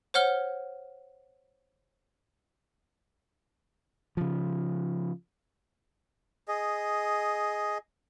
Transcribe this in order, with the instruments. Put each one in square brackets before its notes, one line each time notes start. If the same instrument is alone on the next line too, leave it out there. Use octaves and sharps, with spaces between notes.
[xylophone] C5 C#5 F#5 F6 G7
[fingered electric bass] C#3 F3
[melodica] G#4 D#5